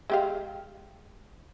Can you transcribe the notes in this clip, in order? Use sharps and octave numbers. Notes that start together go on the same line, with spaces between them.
G#3 G4 F5